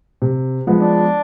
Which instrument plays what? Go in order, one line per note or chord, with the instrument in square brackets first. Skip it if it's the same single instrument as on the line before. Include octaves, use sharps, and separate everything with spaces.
[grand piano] C3
F3 G#3 B3
[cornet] D4